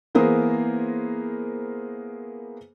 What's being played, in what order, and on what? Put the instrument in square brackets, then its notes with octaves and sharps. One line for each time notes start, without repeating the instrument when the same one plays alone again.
[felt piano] E3 A#3 B3 G#4 A#4 C5